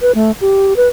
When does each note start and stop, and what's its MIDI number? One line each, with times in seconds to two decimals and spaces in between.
0.01 0.12 71
0.15 0.31 57
0.41 0.74 67
0.77 0.88 71